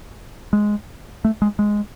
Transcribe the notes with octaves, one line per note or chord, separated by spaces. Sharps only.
G#3
A3
G#3
G#3